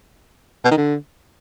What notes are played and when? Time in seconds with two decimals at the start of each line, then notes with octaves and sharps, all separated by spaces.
0.65 B2
0.71 D#3
0.77 D3